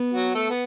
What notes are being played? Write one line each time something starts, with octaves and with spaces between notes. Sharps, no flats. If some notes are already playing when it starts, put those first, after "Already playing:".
Already playing: B3
F#3 F#4
A3 A4
B3